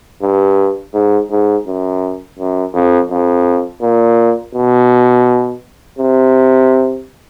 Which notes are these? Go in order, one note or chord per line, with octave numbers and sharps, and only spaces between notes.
G2
G#2
G#2
F#2
F#2
F2
F2
A#2
B2
C3